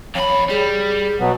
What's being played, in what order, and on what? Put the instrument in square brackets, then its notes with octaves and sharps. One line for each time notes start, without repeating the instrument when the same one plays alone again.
[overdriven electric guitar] F2 B5 [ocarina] C#5
[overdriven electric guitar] G3 [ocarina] G#4
[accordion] B2 F#3 B3